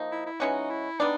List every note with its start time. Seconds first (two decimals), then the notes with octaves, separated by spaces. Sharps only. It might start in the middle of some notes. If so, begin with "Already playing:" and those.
Already playing: F3 A#3 D#4
0.11 E4
0.26 E4
0.40 E3 G#3 C#4 D#4 F#4
0.70 E4
1.00 G3 B3 D4 D#4